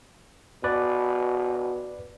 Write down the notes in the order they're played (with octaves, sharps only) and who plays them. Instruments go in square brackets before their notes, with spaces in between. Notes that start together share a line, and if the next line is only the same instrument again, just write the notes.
[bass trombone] B2 [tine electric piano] B4 D5